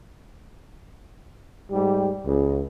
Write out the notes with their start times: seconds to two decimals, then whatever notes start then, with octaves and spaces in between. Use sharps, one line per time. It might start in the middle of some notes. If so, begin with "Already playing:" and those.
1.71 G#2 G3 G4
2.24 C#2